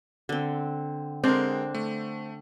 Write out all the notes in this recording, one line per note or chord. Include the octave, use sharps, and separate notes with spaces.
D3 C4
D3 G#3 C4 D4 A#4
A3